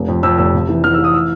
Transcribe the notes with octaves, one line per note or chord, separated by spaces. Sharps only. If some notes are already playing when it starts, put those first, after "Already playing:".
Already playing: F1
F2
F2 E6
F1 E6
C3
E3
E3 F6
E6
E3
D#6
E6